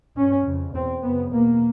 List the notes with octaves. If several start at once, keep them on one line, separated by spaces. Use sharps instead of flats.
G2 C#4
F2 C#3
E2 B2 C4
F#2 C#3 B3
E2 B2 A#3